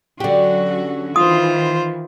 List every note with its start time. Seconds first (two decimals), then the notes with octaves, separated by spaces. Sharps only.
0.20 D3 F#3 C#4 F#4 G4
1.16 D#3 E3 F4 C5 D#6